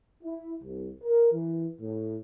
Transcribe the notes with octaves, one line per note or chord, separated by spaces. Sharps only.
E4
C2
A#4
E3
A2